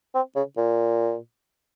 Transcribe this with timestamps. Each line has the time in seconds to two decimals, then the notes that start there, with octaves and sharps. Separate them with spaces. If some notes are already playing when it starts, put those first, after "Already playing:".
0.15 C4
0.36 C#3
0.57 A#2